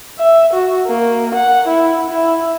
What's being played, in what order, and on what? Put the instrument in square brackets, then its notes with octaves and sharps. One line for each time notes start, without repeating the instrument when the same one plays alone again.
[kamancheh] E5
F#4
A#3
F#5
E4
E4